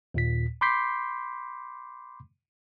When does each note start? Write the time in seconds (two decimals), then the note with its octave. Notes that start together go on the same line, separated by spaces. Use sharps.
0.14 D#2 A#2 B6
0.61 B5 C6 D6 G6 B6 C7